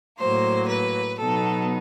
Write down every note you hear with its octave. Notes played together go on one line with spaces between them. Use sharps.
A2 F#3 A#3 C5
B4
B2 F#3 B3 D#4 A4